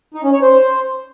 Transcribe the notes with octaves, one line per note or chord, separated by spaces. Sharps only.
D#4
C#4
C#5
C5